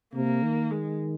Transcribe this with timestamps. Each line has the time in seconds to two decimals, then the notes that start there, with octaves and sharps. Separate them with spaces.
0.14 C3 A#3
0.43 D#3
0.71 G#3